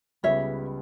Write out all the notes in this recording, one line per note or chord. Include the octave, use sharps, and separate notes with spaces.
C#2 C#3 G3 B3 C#5 E5